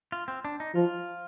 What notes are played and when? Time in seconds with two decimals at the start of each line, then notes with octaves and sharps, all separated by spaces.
0.12 F4
0.28 C4
0.45 D4
0.60 D#4
0.75 F3 F4